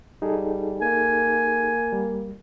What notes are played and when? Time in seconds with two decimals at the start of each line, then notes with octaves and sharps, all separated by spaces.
0.22 G3 D#4 G#4 A4
0.82 A#3 G#5
1.92 G3